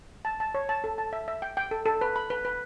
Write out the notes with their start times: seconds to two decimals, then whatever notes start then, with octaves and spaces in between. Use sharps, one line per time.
0.25 A5
0.40 A5
0.54 C#5
0.69 A5
0.84 A4
0.98 A5
1.13 E5
1.28 E5
1.42 G5
1.57 G5
1.71 A4
1.86 A4
2.01 B4
2.16 B5
2.30 B4
2.45 B4